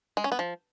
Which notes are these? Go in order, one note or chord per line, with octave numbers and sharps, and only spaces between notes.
G#3
C#4
B3
F3